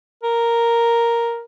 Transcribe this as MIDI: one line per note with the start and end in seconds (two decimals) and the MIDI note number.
0.23 1.43 70